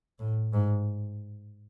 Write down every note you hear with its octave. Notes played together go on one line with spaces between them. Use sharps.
A2
G#2